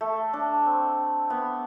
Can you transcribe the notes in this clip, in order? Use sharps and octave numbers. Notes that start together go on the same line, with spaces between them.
A3
D4
C4
B3